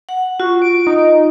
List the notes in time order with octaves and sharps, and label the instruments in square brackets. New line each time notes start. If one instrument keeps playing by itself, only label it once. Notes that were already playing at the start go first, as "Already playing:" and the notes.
[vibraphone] F#5
[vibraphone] F4 [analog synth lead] F#4
[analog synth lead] D7
D#4